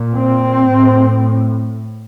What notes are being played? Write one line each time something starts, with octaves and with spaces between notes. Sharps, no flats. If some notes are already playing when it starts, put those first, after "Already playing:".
Already playing: A#2
C4
A2